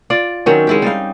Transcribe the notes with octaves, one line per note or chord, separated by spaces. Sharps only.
F4 D5
D#3 F#3 C4 C#4
G#3 E4 G4
G3 D#4 F5